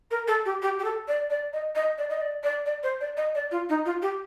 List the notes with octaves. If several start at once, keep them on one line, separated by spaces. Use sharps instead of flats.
A#4
A4
G4
G4
G4
A4
D5
D5
D#5
D#5
D5
D#5
D5
D5
D5
C5
D5
D#5
D5
F4
D#4
F4
G4